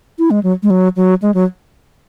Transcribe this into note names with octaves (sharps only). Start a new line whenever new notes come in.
E4
G#3
F#3
G#3
F#3
F#3
G#3
F#3